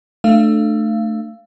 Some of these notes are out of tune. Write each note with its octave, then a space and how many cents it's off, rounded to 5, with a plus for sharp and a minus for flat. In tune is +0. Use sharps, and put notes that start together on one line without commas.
A3 +0 D4 +25 F5 -25